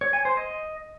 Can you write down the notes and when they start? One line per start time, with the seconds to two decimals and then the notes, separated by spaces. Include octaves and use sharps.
0.01 C#5
0.13 G#5
0.25 C5
0.37 D#5